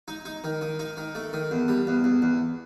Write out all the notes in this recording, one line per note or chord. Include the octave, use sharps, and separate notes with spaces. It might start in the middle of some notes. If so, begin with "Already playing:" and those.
D#4
D#4
D#3
D#3
D#4
D#3
A3
D#3
E2
G3
E2
E2
E2